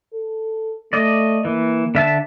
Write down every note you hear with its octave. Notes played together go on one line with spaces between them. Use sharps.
A4
A3 D5 D#5
E3 A#3
D3 E5 A5